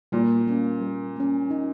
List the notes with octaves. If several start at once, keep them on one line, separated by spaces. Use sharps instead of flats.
A#2 G3
A#3 C#4
G3
A#3 C#4
D#4